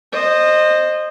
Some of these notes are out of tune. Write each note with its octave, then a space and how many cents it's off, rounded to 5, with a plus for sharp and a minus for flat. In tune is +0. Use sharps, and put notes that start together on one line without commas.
C5 +5 D#5 -20